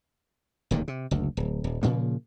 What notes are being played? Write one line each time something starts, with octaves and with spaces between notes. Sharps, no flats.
D1 D#2 A#2 D#3
C3
F#1 D2
D1
D#1
A#2 C#3 F3 A#3